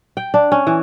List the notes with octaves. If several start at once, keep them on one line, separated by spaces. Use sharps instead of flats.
G5
D4
C#4
E3